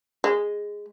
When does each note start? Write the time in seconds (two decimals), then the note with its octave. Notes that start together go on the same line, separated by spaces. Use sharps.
0.24 G#3